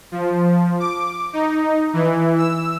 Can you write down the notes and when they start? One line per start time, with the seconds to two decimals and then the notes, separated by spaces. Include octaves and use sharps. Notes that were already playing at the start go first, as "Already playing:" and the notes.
0.12 F3
0.80 D6
1.33 D#4
1.93 E3
2.38 E6